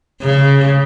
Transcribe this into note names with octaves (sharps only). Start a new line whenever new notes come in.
C#3